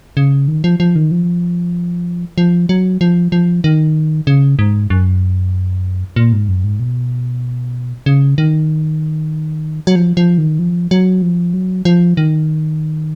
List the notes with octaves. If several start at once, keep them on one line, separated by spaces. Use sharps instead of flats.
C#3
D#3
F3
F3
D#3
F3
F3
F#3
F3
F3
D#3
C#3
G#2
F#2
A#2
G#2
F#2
G#2
B2
C#3
D#3
F#3
F3
F3
D#3
F3
F#3
F3
F#3
F3
D#3